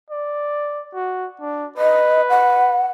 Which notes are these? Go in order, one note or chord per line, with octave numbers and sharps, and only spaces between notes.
D5
F#4
D4
B4 D#5
F#5